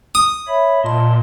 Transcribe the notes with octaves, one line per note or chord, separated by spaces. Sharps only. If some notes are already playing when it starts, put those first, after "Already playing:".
D#6
C#5 E5 B5
A#2 D#5 A5 C6